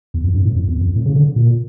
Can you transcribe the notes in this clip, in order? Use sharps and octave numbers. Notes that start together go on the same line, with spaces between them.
E2
F2
G2
A2
F2
E2
F2
A2
C#3
D3
A#2